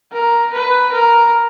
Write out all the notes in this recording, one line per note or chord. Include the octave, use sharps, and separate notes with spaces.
A#4
B4
A#4